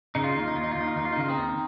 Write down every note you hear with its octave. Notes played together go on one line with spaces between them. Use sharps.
C#3 D#4
F4
D#4
D#2 F4
D#4
D#2 F4
D#4
F4
D#2
D#4
F4
D#2 D#4
F4
D#4
C#3 F4
C4 D#4
D#2